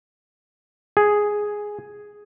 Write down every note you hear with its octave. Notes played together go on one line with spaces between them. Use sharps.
G#4